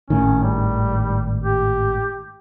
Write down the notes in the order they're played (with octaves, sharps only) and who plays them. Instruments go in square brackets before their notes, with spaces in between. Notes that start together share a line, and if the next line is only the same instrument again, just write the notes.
[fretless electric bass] G#1 A2 D#3 [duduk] C#4
[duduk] G3
G4